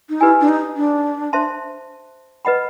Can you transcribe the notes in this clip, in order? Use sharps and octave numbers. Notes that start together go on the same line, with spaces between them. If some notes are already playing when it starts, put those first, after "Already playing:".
D#4
E4 G4 B4 D#5 G#5
D4
D#4
D4
C5 E5 A5 C6
B4 D#5 F#5 B5